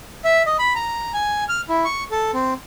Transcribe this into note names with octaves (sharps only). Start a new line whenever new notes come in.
E5
D#5
B5
A#5
G#5
F6
E4
C#6
A4
C4